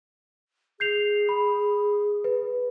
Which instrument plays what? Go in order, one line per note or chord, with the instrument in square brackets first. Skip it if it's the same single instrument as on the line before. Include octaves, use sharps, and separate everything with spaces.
[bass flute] G#4 [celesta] G6 C7 F7
[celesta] B5
B4